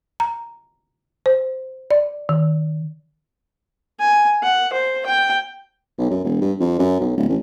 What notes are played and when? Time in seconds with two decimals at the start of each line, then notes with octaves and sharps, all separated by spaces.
0.20 A#5
1.26 C5
1.91 D5
2.29 D#3
4.00 G#5
4.43 F#5
4.73 C5
5.06 G5
5.98 B1
6.10 F#2
6.24 E1
6.41 G2
6.60 F2
6.79 F#2
7.00 B1
7.17 D1
7.29 A1